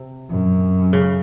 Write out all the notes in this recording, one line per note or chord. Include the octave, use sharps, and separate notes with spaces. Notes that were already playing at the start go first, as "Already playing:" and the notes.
Already playing: C3
F#2
C#3